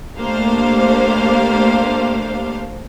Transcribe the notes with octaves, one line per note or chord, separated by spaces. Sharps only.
A3 A#3 D4 G4 C5 F5